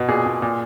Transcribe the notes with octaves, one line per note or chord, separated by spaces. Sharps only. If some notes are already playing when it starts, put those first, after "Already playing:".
Already playing: B2
A#2 G#4
A#2
A#2